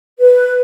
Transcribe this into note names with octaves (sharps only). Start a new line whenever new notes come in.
B4